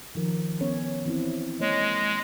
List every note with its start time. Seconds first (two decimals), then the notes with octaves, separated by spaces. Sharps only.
0.15 D#3 F3 A#4
0.60 B3 C#4 C#5
1.06 E3 C4 E4
1.60 G#3 A#3 C#5